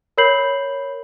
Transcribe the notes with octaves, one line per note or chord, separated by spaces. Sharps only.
A#4 C#5 B5 G6 C7 F#7